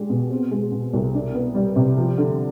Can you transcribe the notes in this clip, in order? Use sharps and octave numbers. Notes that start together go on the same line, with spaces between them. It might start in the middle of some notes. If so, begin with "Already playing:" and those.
Already playing: G#3 D4 G4
B2
C4
G#3
B2
C2
D4
B3
G3
C3
F3
D3